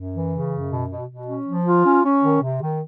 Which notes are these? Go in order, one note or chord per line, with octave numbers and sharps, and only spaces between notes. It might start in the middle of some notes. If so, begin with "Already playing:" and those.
Already playing: F#2
E3
C#3
F#2
B2
B2
B2
C#4
F3
F4
C#4
C#4
D#3
C3
D#3